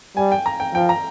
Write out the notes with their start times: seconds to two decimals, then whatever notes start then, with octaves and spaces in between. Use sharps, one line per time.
0.17 G3 G#5
0.32 G5
0.46 A#5
0.60 G5
0.74 F3 G5
0.89 A#5